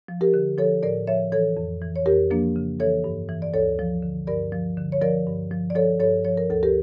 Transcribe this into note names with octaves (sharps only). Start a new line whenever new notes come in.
F3
G4 A#4
D3
F3 A4 C#5
A2 A#4 D5
F3 C#5 E5
E3 A4 C#5
F2
E3
C#5
F2 G4 A#4
F3 A#3 D4
C#3
E3 A4 C#5
G2
E3
D5
D2 A4 C#5
F3
D3
G2 A#4 D5
F3
D3
C#5
F3 A#4 D5
G2
F3
D5
F3 A4 C#5
G2 A4 C#5
F3 C#5
A#4
D2 A4
G4 A#4